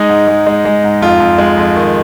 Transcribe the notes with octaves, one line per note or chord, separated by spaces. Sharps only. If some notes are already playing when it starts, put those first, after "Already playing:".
Already playing: G#3 D#4
G#2
G#3
G#3
G#3
G#2
F2 F4
F2
G#3
F2
D#3